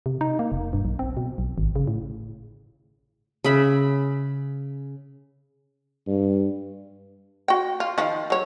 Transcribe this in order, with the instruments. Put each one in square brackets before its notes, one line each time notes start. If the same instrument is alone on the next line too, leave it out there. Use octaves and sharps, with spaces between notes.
[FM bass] C3
D#4
A#3
F1
G2
B1
C4
B2
B1
G#1
C#3
A2
[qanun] C#3 E5 B5
[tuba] G2
[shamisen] F#4 G5
F4
D#3 F3
F#3 C#5